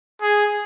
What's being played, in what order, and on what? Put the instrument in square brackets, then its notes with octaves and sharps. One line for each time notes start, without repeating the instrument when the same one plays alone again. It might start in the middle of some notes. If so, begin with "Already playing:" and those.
[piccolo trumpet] G#4